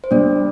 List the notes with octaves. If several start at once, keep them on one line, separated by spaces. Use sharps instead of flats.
C5
G3 D4 D5